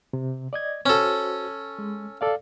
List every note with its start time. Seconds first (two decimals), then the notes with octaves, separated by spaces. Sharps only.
0.13 C3
0.53 D5 D#5 G#6
0.86 C#4 F#4 A4 C5
1.79 G#3
2.21 A4 D5 F5